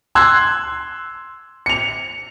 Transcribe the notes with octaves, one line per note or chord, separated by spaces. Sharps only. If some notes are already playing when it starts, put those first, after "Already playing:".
C6 E6 F#6 G#6
C#7 F7